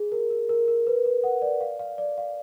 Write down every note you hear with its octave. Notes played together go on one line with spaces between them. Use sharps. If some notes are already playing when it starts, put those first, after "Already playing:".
Already playing: G#4
A#4
A#4
A#4
A#4
B4
B4
F#5
D5
F5
F5
D5
F5